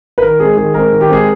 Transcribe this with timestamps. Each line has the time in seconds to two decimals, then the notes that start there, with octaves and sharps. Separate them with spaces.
0.18 B4
0.22 D#3 A#4
0.40 G#3 C4 G#4
0.57 D#3 G#4
0.74 G#3 C4 A#4
0.93 D#3
1.01 G4
1.09 G#3 C4 G#4